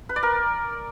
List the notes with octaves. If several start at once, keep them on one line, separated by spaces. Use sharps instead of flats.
B4
D5
A#4